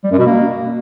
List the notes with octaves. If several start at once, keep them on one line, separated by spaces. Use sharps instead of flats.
G3
F#2
B2
A#3